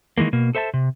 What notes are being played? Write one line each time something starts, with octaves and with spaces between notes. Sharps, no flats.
D#3 E3 G#3 A#3
B2 A#3
A4 C5 E5 G#5 A5
C3